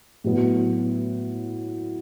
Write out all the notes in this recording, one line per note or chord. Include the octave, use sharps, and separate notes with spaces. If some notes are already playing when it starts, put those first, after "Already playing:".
A2 F#3 B3